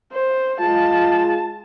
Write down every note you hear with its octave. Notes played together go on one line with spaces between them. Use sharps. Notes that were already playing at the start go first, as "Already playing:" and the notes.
C5
G#3 F4 A5